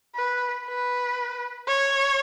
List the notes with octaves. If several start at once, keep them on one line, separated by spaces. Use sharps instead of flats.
B4
B4
C#5